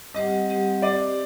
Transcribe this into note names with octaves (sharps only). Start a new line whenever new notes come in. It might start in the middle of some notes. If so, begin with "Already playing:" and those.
G3 C4 G4 C5 D#5 F#5
G3 C4 G4 C5 F#5
C4 G4 C5 D5